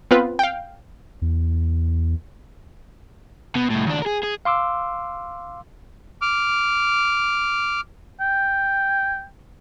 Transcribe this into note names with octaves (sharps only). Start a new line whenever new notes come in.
B3 C4 F4 B4
F5 G5
E2
B2
C2 A2
D#2 D4
G#4 A#4
G#4
F5 C6 D6 E6
D6 F6
G5